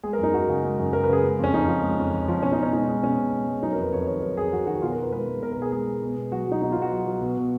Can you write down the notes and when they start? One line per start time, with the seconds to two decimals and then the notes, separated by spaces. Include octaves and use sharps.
0.03 G#3 G#4
0.13 A#4
0.18 F#2
0.23 D#4
0.34 F#2 F#4
0.49 C#3
0.64 G#3
0.78 F#2
0.93 F#2 A#4
1.04 B4
1.09 C#3 G#4
1.23 G#3
1.39 F2 C#4
1.54 F2 D#4
1.68 F3
1.83 G#3
1.98 F2
2.13 F2
2.28 F3
2.42 B2 C#4
2.52 D#4
2.58 B2 C#4
2.73 G#3 D#4
2.88 G#3
3.03 B2 C#4
3.18 B2
3.32 G#3
3.48 G#3
3.63 F#3 D#4
3.72 A#4
3.78 F2 B4
3.93 F2 C#5
4.07 D#3 C#5
4.22 F#3 A#4
4.37 F2 G#4
4.53 F2 F#4
4.67 D#3 F#4
4.82 B2 F4
4.92 A#4
4.97 B2
5.02 B4
5.12 G#3 B4
5.28 G#3
5.42 B2 A#4
5.52 A#4
5.57 B2 G#4
5.72 G#3 G#4
5.87 G#3
6.02 B2
6.17 B2
6.32 F#3 F#4
6.47 F#3 D#4
6.62 B2 D#4
6.72 F4
6.76 B2
6.82 F#4
6.92 F#3
7.07 F#3
7.21 B2
7.37 B2